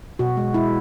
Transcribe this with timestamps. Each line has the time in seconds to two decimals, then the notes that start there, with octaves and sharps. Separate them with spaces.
0.19 B2 F#4
0.37 G#3
0.54 G#3 E4